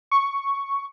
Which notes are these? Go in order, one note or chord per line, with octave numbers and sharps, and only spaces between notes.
C#6